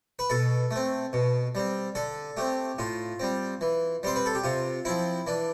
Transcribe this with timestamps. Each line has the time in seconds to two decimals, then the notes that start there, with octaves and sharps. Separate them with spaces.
0.19 B4
0.30 B2 A4
0.71 A3
0.76 C4
1.13 B2
1.55 G3 C4
1.95 D3 A4
2.37 A3 C4 G4
2.78 A2 F4
3.20 G3 C4
3.61 E3
4.03 G3 C4 C5
4.16 B4
4.26 A4
4.35 G4
4.44 C3 F4
4.85 F3 C4 E4
5.27 E3 D4